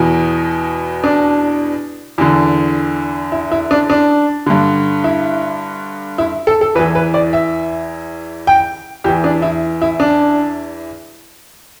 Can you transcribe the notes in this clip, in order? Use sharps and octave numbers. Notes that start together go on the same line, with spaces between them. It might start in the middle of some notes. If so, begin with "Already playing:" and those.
Already playing: E2 B2
D4
E2 D3
E4
E4
D4
D4
G2 D3
E4
E4
A4
A4
E2 E3 B4
B4
D5
E5
G5
E2 E3 G4
D4
E4
E4
D4